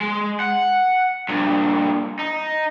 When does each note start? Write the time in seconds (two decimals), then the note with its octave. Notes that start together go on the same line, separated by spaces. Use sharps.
0.01 G#3
0.40 F#5
1.29 G2 A#2
2.19 D#4